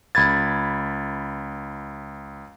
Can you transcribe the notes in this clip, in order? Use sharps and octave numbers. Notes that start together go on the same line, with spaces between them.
C#2 B5 G#6 A6